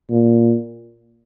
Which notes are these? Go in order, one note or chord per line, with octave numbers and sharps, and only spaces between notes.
A#2